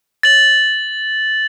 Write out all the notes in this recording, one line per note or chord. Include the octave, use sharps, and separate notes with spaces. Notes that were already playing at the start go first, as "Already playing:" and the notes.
A6 F#7